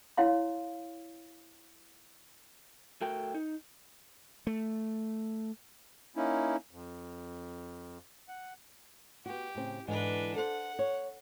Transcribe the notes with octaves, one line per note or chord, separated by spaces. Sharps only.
E4 C#5 F5 C6
A3 F#4 A#4 G5
D#4
A3
A#3 C#4 D#4 E4
F2
F#5
B3 F#4 G4
A2 C#3 C4
G#2 D3 E3 D4 B4
A4 C5 F#5
C#5